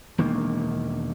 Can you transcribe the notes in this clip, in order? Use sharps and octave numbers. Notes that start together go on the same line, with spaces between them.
E1 D#3 A#3